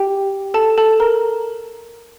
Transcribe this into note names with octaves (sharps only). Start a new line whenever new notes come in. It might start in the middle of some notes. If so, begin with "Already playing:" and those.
Already playing: G4 G5
A4 A5
A4 A5
A#4 A#5